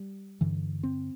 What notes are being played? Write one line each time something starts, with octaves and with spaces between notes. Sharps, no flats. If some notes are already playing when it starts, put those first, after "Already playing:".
Already playing: G3
G2 D3 E3
C4